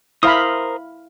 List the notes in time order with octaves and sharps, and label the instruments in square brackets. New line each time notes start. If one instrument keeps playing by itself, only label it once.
[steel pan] E4 F5 B5 [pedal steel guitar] A#4 C5 D#6